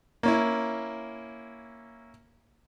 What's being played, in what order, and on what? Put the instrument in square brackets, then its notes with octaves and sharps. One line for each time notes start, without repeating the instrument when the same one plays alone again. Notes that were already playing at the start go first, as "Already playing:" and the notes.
[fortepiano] A#3 C#4 E4